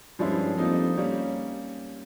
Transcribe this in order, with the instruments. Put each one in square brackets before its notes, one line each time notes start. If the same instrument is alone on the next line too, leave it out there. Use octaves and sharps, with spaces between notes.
[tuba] G2 [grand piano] F3 G#3 C#4 E4
[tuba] F2 [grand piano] G3 A#3 D#4
[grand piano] G3 A#3 C#4